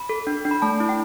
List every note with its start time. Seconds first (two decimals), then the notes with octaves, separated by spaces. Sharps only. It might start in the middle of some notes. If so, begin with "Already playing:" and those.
Already playing: B5
0.09 A4
0.27 D4
0.45 D4
0.51 B5
0.62 A3 A5
0.80 E4
0.89 G5